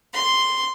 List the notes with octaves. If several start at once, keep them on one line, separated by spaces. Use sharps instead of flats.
C6